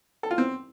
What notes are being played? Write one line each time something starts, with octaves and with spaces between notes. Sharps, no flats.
A4
F4
C4